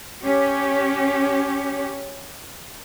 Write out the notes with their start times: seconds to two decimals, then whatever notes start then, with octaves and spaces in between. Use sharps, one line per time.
0.24 C#4 G4 C#5